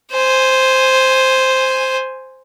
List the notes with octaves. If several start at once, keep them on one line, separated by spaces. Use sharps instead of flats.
C5 G#5